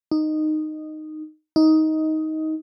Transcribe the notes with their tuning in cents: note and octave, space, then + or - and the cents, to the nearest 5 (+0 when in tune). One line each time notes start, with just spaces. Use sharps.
D#4 -10
D#4 +15